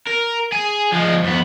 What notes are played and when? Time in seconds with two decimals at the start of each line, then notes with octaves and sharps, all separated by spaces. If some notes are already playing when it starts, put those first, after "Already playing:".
0.07 A#4
0.52 G#4
0.93 F3 G#3
1.24 F2 B3